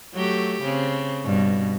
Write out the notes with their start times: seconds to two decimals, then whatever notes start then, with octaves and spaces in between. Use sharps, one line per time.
0.14 F#3 A3 G4
0.64 C#3 C4
1.24 G2 B2